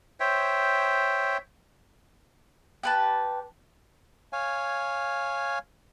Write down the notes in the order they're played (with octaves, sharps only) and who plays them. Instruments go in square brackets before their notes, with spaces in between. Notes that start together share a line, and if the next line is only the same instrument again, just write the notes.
[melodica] C5 C#5 E5 G5
[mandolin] G4 B4 A5
[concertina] C#5 F5 G#5